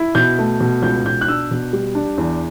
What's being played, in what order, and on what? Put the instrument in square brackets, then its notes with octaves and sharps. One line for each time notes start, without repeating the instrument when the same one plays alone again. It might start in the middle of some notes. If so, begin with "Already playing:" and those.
Already playing: [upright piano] E4
B2 G6
A3
B2
C#2 G6
B2 G6
F#6
D4 E6
B2
G3
D4
E2